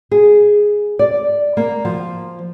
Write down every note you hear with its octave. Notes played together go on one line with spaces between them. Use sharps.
G#4
D5
A#3
F3